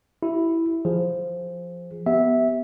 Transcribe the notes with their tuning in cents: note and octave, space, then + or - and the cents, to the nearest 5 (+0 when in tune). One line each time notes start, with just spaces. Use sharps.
E4 +0 G4 -45
F3 +0 G#4 +0
B3 +0 G4 +0 E5 -15